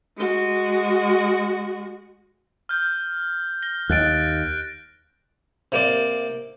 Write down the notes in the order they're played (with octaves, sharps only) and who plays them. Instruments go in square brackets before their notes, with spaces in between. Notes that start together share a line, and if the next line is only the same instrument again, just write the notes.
[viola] G#3 F#4
[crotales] F6 G6
A#6 G7
[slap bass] D#2 [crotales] F#6 A6 D7
[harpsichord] C3 A#3 D5